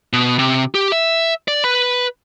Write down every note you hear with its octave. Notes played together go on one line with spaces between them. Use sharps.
B2
C3
G4
E5
D5
B4 B5